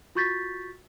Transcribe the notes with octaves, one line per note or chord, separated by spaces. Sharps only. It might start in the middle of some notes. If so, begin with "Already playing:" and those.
F4 F#4 C#6 G6 A6 B6